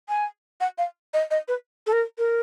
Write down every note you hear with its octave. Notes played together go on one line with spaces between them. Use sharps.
G#5
F#5
F5
D#5
D#5
B4
A4
A#4
A#4